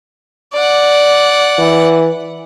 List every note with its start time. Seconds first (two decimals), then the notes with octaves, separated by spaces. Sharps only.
0.53 D5 F#5
1.59 E3